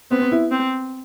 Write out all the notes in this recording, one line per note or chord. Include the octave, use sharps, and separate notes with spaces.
B3 C4
C4
E4
C4